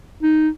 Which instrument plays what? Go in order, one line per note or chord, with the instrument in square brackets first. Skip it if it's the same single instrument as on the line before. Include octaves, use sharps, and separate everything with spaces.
[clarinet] D#4